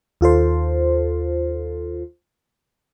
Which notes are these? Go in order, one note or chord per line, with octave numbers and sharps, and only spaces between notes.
D#2 F4 A4 C5